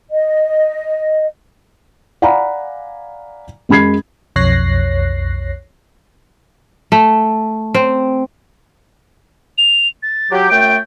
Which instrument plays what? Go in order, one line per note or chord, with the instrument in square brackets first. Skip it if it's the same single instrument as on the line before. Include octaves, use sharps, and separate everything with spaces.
[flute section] D#5
[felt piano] D5 F5 F#5 G#5 A#5 B5
F#2 G#3 B5 G#6 C7
[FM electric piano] B1 F2 C#5 F#6 A#6 C7
[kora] A3
C4
[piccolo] F7
A6
[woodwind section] F#3 G4
[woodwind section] F#2 A3 G5 [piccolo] D7